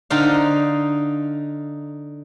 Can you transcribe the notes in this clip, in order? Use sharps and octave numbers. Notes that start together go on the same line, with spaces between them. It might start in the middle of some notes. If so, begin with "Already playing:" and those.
D3 D#4 C5 F5